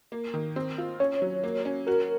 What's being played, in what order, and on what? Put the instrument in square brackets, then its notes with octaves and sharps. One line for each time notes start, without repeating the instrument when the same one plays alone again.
[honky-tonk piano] A#3
D#3
C4
F4
[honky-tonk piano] C#4 [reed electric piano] C#5
[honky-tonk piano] F#3
A#3
C#4
[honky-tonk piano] F#4 [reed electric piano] A#4